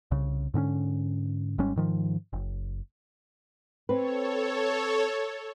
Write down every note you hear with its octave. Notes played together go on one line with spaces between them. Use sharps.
C2 C#3
G#2 D3 C4 C#4
G#1 G#2 G3 C#4
G#2 D#3 F3
F#1
C4 A4 B4 C#5